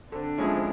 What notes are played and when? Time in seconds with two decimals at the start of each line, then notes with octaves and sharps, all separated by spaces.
0.11 D3 C4 D4
0.37 F3 G#3 C#4 E4